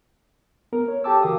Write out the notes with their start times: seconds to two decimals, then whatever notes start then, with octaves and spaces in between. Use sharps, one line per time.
0.73 B3 A#4
0.88 C#5
1.04 G4 A4 G5 A5 D6 E6
1.22 C#3 E3 F#4 A#4 F5 D#6